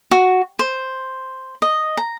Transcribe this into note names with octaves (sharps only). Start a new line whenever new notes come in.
F#4
C5
D#5
A#5